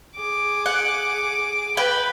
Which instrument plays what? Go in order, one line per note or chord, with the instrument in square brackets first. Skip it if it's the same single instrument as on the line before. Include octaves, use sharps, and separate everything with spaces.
[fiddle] G#4 D6
[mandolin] F#5
[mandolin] B4 G5 [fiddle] B5